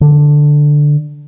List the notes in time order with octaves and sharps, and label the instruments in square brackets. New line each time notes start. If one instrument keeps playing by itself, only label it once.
[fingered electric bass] D3